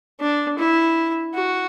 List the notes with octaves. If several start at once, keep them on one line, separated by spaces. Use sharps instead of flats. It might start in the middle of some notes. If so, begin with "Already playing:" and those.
D4
E4
F#4